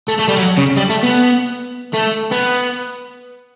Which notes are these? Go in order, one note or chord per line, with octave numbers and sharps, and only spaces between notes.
A3
A3
G3
F#3
C#3
G3
A3
B3
A3
B3